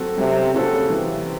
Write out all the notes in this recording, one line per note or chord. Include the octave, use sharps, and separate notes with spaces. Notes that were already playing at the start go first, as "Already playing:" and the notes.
Already playing: F#3 C4 F#4 A4
C3 F#3
C#3 C4 F#4 A4
C3 E3